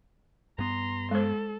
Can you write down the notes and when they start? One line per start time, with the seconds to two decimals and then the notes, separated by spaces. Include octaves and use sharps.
0.59 G2 B3 A#5 C6
1.11 G#3 A4 C5